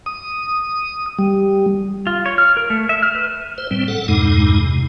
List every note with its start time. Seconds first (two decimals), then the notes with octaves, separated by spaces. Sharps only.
0.06 D#6
1.19 G3
2.07 F4
2.26 C#5
2.38 F6
2.57 A#4
2.70 A3
2.89 E5
3.03 F6
3.15 B4
3.58 C5
3.71 A2 G3 C4
3.88 A4 F#5
4.08 E2 G2 A#2 G#3 D#4
4.60 C3